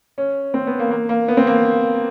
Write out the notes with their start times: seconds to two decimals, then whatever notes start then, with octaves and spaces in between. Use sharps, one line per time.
0.18 C#4
0.54 C4
0.67 B3
0.79 A#3
0.91 A#3
1.09 A#3
1.28 B3
1.37 C4
1.47 A#3